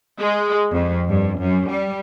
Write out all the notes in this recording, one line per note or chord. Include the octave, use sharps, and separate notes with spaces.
G#3
F2
G2
F#2
G3